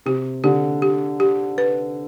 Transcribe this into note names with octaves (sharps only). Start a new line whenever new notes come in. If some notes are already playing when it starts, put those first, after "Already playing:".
C3 G4
D3 G4
G4
G4
B4